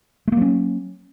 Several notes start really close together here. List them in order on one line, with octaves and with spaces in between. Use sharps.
A3 A#3 F#3 C#4